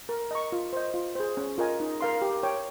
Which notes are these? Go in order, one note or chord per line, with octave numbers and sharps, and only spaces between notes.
A#4
D#5 A#5 C#6
F4
C5 D#5
F4
G#4 C5
C#4
F4 A#4 D#5 G#5
D#4
A#4 F5 C6
G4
C#5 G5